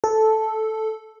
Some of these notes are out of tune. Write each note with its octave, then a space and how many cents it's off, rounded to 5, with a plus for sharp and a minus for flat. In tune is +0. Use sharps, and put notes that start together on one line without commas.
A4 -5